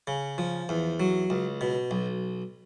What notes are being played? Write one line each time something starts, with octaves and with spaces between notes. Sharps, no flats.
C#3
F3
E2
F#3
C#2
B2
B1